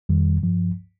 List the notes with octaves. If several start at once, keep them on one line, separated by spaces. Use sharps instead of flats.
F2 D#3 G3
G2 F3